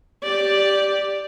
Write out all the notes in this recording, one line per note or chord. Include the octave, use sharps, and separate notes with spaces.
G4 D5